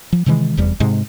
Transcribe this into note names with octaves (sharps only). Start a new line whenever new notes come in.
F3
C3 D#3 E3 G#3
F1 E2 G3
G#2 C3 G#3